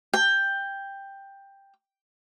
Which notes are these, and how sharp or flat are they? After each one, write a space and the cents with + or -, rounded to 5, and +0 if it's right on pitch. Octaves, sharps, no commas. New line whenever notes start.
G5 +10